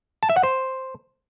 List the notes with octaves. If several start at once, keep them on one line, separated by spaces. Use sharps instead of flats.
A5
E5
F#5
C5